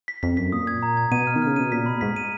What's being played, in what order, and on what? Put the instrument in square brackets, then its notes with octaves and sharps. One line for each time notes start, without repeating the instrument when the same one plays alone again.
[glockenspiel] B6
[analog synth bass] F2 [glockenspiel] B6
[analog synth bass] F#2 [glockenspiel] B6
[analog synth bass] A#2 [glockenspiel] D#6
[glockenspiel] G#6
A#5
G#6
[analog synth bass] B2 [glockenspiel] D#7
[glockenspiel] F6
[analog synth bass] D#3
[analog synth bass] C#3 [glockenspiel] F6
[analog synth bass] B2 [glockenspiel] D#7
[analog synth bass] A#2 [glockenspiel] B6
[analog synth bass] B2 [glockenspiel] B5
[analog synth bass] A#2
[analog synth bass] G#2 [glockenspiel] B6
[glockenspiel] D#7